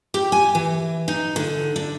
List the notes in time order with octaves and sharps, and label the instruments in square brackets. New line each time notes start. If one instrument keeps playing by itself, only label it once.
[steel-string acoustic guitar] G4
G#5
E3
D#4
D3
D4